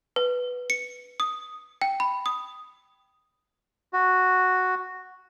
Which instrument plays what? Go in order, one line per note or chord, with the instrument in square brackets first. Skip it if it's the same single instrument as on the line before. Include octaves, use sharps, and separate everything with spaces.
[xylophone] B4
C#7
D#6
G5
B5
D#6
[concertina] F#4